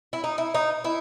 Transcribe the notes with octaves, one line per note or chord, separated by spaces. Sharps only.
E4
D#4
E4
D#4
E4